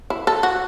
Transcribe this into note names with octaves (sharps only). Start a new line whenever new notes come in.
E4
A4
F#4